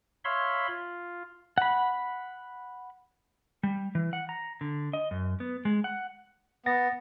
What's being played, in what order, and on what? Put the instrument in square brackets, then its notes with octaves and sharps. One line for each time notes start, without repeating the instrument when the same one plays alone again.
[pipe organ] C#5 E5 F5 B5 C6
F4
[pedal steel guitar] F#5 B5
[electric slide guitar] G3
E3
F#5
A#5
D3
D#5
F#2
B3
G#3
F#5
[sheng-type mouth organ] B3 [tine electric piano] F#5 A6 A#6